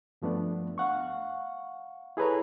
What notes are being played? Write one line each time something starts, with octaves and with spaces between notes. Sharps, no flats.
G2 F3 A3 B3 D4
F5 F#5 C#6
E4 G#4 A4 B4 C#5 A#5